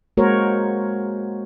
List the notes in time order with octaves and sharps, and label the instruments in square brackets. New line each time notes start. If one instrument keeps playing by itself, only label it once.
[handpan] G#3 A#3 F#4 A#4 C5 C#5